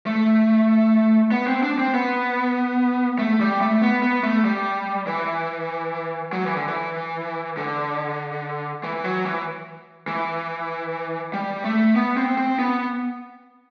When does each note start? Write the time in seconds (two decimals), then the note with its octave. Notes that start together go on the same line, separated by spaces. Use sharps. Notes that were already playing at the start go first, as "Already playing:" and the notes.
0.06 A3
1.32 B3
1.47 C4
1.63 D4
1.79 C4
1.94 B3
3.19 A3
3.41 G3
3.61 A3
3.82 B3
4.03 B3
4.23 A3
4.45 G3
5.07 E3
6.33 F#3
6.45 E3
6.56 D3
6.68 E3
7.57 D3
8.84 E3
9.04 F#3
9.25 E3
10.08 E3
11.33 G3
11.64 A3
11.96 B3
12.17 C4
12.37 C4
12.59 B3